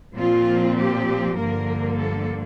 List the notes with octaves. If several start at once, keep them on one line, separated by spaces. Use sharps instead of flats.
A#2 F3 C4 F4
G4
G2 D3 F3 A#3 A#4
A4